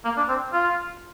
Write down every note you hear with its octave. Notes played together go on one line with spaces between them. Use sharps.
A#3
D4
C4
F4